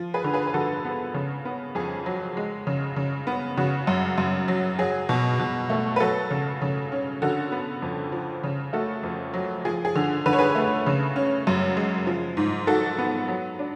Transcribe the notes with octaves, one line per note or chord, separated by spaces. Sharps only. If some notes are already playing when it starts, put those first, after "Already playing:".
Already playing: F3
G#4 B4
D3
G#4 B4
B4
D3 F#4 A4
B3
C#3
B3
F2 G#4
F#3
G#3
C#3
C#3
B3
C#3 F#4
F#2
F#2
F#3
F#3 G#4
B2
B2
A3
B4
F#3 F#4 A4
C#3
C#3
C#4
D3 F#4 A4
B3
F2
F3
C#3
A3 F#4 A4
F2
F#3
F3 G#4
G#4
D3
D3 B4
C#5
G#4 B4
A3
C#3
C#4
F#2
G#3
F3
G#2
G#2 F#4 A4
B3
F#3
D4